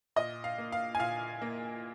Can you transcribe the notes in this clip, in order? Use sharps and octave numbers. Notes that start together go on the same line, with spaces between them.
A#2 D#5
F5
A#3
F5
G#5
A#2 F5
A#3